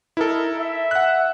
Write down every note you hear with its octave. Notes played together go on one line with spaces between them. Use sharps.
D#4 E4 A4 A#4
E5
F#5 F#6